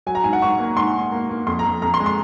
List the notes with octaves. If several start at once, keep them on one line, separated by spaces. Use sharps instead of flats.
F#3 G#5
A#5
G#2 G#5
F#5
G#2 C#6
A#3
G#2 C6
G#2
A#3
A#3
F2 C6
A#5
F2
F2 A#5
C6
G#3
C6